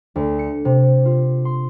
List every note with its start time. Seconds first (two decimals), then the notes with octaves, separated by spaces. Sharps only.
0.16 D2
0.39 C#7
0.65 C3
1.05 F4
1.45 C6